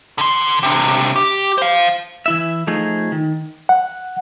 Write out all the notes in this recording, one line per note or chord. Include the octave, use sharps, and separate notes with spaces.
D3 C6
C3 D4
G4
C5 F5
E3 E4 E5
F3 A3 D#4 G#4
D#3
F#5